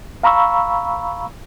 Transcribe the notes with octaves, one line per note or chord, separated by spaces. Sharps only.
F5 A#5 B5 C#6 E6